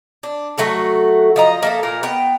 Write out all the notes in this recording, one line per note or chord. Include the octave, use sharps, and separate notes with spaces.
D4
F#3 A3 F#4 A4
F3 D#5 A#5
A#3 A4 E5
A#2 A#3 A#4
B3 G5